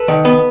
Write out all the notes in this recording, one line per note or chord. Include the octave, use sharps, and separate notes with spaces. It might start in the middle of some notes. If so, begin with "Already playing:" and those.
Already playing: A4 B4
D#3
B3